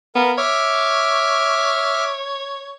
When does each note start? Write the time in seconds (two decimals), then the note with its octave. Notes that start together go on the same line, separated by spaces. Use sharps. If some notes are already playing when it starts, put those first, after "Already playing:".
0.15 B3 A#4 F5
0.38 C#5 E5 D6 F6